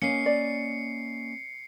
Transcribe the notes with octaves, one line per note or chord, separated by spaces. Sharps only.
A#3 C#4 D#5 C7 C#7
D5